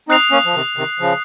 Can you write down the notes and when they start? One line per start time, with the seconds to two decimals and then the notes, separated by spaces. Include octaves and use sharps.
0.09 C4 D#4 D#6 F#6 C7 F7
0.31 A#3 C#4
0.45 F3
0.54 C3 D#3
0.77 C3 D#3
1.00 C#3 F3